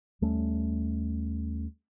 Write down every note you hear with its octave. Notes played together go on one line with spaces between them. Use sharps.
D#2 G3 A3 C#4